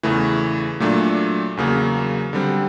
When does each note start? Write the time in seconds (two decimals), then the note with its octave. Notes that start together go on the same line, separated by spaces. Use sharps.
0.03 E2 C#3 E3 A3
0.80 A#2 F#3 A3 D4
1.57 E2 C#3 F#3 A#3
2.33 D3 G3 C4